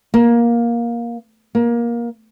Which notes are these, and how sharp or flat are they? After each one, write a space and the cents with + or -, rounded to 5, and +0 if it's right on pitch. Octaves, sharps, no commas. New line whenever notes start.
A#3 +15
A#3 +20